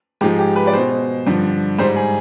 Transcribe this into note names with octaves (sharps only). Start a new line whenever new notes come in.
G#2 F3 G#3 G4
G4
B4
D5
B2 G#3 C5
G2 D3 F3
G#2 G3 C5
G#4